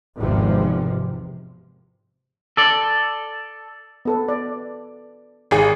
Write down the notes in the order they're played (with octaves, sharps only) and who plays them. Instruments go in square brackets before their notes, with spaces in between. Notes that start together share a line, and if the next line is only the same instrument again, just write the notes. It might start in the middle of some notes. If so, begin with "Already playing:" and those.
[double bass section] G#1 E2 G#2 C3 F3
[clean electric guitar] A4 D5
[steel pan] B3 A4 B4
D5
[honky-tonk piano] G#1 G#4